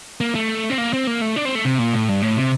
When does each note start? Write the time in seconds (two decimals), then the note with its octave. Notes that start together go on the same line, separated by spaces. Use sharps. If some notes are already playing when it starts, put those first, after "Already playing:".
0.21 A#3
0.35 A3
0.70 C4
0.78 A#3
0.93 C4
1.07 A#3
1.21 A3
1.36 D4
1.45 C4
1.55 A3
1.65 C3
1.79 A#2
1.94 A2
2.09 G2
2.22 A2
2.37 C3